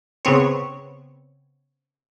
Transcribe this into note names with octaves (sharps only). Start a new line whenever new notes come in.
C#3 B3 C4 C#5